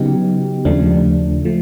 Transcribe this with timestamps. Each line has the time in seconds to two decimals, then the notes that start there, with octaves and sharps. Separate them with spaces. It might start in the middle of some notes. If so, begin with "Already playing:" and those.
Already playing: C#3 F#3 B3 D#4 G4
0.65 D#2 C#3 F3 A3 D4
1.45 F3 A3